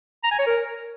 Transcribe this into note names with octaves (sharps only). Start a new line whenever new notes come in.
A#5
G#5
C#5
A#4